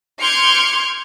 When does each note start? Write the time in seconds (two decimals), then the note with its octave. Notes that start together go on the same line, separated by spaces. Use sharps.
0.20 C6 D6 F6 G6 G#6 C#7